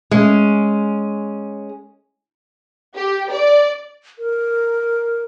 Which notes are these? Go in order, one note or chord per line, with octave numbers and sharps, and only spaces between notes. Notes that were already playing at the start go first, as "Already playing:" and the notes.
G#3 C#4
G4
D5
A#4